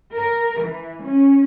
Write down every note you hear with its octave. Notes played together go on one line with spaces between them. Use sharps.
A#4
E3
C#4